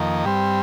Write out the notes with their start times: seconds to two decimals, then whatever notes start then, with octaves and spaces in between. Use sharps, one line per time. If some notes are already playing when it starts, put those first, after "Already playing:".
Already playing: F2 D#3 A#3
0.25 G2 G3 C4